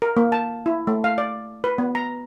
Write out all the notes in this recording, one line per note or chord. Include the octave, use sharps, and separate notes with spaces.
A#4
A#3
A5
E4
A3
F5
D5
B4
B3
A#5